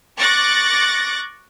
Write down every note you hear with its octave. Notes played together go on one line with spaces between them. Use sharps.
C#6 D6 F#6 A6 A#6